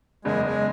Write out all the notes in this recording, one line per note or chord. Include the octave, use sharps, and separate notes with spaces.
F#1 E2 C#3 G#3
G#3